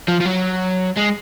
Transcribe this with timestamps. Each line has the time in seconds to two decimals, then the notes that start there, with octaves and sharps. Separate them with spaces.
0.08 F3
0.20 F3
0.25 F#3
0.97 G#3